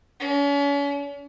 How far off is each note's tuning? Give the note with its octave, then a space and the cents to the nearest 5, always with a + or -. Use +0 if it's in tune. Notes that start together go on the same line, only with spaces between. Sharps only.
C#4 +40